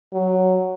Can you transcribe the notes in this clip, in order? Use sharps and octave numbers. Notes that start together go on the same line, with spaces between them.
F#3